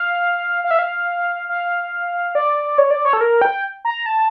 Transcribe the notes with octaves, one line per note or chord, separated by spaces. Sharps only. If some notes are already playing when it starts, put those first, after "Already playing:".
Already playing: F5
F5
E5
F5
F5
D5
C#5
D5
C#5
A4
A#4
G5
A#5
A5